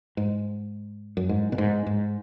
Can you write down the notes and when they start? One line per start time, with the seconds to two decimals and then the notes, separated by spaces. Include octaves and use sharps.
0.17 G#2
1.17 F#2
1.29 G#2
1.52 B2
1.58 G#2
1.86 G#2